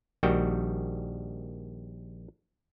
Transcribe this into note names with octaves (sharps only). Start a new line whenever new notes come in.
A#1 D#3 G3 F#4 G5